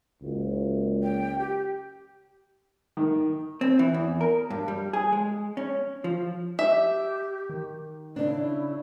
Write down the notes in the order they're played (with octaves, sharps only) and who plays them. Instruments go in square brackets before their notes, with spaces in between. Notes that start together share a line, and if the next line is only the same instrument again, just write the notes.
[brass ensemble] F#1 C#2
[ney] G5
G4
[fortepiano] D#3
[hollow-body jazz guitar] C4
E3
E2
A#4
G2
G3
G#4
G#3
C#4
F3
[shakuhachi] G4 [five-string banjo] E5
[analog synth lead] D#3
[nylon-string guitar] C#3 D4 [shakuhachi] E4